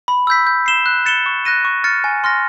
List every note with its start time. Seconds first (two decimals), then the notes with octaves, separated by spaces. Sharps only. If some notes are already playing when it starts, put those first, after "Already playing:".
0.08 B5
0.27 E6 G6 B6
0.47 G6
0.66 C7 E7 G7
0.86 F#6
1.06 A6 C#7 E7 G7
1.26 C#6
1.45 F#6 A#6 D#7
1.65 C#6
1.84 F6 A6 C#7
2.04 G#5
2.24 C6 F6 A#6